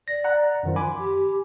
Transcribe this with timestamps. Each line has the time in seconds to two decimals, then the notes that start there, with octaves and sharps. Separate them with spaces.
0.08 D5 A#6
0.24 F#5 A#5 F#6
0.63 F#2 D#3 F3
0.76 G#5 B5 C6 D6
0.99 G4